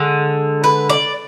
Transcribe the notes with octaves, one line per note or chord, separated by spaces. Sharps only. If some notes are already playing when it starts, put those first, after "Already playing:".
Already playing: D3 G#3
B4
D5